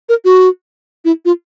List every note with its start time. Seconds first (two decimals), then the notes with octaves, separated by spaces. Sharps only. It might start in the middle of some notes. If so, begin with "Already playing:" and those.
0.09 A#4
0.25 F#4
1.05 E4
1.25 F4